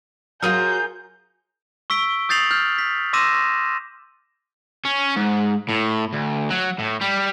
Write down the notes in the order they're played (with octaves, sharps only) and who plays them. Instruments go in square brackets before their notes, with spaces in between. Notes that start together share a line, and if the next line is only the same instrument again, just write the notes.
[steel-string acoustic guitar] F#3 F#4 [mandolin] F4 G#4 A#4 [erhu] G6
[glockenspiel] C#6 E6 B6 D7 G7
D#6 G6 A6 C7 F7 F#7
F6 G6
B6
C6 D6 E6 A#6 D#7 E7
[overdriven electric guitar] C#4
G#2
A2
D2
F#3
A2
G3